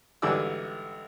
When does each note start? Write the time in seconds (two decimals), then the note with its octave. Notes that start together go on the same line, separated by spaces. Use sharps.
0.22 G#1 D3 E3 G3 D5 E6